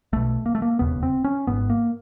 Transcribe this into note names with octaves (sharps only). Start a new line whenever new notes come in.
B1 B2 A3
A#3
A3
A#3
E1 D#2 C#3 B3
C4
C#4
G#1 G#2 B3
A#3